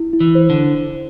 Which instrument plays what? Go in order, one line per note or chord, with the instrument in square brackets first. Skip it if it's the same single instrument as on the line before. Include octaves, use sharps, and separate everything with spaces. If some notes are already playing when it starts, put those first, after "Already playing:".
Already playing: [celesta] E4
E4
[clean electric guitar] E3
[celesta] C5
[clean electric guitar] D3